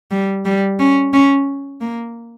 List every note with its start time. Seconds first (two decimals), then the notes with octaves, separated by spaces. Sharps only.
0.11 G3
0.45 G3
0.79 C#4
1.13 C#4
1.81 A#3